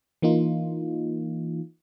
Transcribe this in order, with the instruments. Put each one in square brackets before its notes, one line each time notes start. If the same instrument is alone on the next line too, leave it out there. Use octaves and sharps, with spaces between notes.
[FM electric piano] E3 A#3 D#4 F4